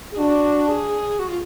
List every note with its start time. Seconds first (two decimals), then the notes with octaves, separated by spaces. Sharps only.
0.12 G#4
0.18 D4 F#4
0.68 G#4
1.19 F#4
1.29 F4